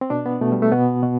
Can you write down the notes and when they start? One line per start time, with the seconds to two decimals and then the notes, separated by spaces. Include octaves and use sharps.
0.01 C4
0.10 B2 D4
0.26 B3
0.41 B2 A3
0.52 G3
0.62 A3
0.72 B2 B3
1.03 B2